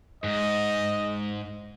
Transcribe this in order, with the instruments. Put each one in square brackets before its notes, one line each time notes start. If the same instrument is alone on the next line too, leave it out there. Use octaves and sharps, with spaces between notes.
[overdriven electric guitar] G#2 [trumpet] D#5